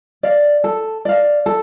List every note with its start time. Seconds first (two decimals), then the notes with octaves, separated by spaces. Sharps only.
0.23 D5 F5
0.64 A4
1.05 D5 F5
1.46 A4